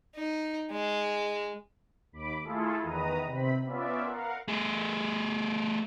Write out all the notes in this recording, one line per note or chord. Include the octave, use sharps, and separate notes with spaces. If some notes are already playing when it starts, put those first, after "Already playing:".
D#4
G#3
D#2 B5 D6
A3 E4 F4 G#4 A4
E2 D#3 B4 A#5 D#6
C3 C4 B5
B3 C#4 F4 D5 E5
A#4 F5 F#5
A3 G#4